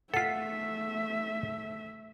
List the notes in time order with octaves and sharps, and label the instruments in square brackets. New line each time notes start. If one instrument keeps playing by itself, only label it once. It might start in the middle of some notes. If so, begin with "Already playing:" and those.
[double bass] A3 [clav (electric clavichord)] F4 A4 [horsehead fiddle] E5 [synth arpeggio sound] F#5 B6